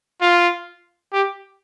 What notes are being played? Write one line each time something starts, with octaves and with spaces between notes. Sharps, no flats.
F4
G4